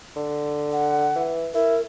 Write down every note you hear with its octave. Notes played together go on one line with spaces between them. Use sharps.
D3
F#5
E3
E4 A#4